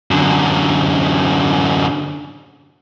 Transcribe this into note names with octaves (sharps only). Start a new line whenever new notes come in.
F#2 D3